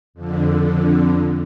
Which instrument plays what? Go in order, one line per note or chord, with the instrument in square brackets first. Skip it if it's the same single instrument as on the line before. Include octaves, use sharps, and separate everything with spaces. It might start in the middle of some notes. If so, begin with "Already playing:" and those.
[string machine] F2 D3